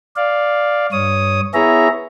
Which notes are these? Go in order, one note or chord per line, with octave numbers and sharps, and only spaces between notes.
D5 F5
G2 C#5 D#6
B3 E4 G#4 C#5 E5 A#5